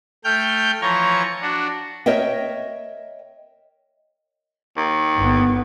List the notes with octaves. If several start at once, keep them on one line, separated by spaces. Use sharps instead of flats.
A3 G5 F6 G6
E3 F3 C#5 A#5 C#6
D4 F#4
A#4 C#5 D#5 E5 G5
D#2
G1 B3